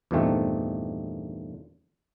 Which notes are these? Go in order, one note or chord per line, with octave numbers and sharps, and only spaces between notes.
E2 G2 A#2 D#3 A3 C4